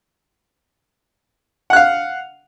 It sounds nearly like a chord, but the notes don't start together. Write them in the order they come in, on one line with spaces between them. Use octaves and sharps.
F#5 F#6 F5